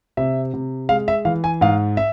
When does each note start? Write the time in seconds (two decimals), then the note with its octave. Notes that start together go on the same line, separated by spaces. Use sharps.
0.17 C3 E5
0.54 C3
0.89 G#3 F5
1.08 E5
1.25 E3 F5
1.44 G#5
1.61 G#2 F5
1.97 E5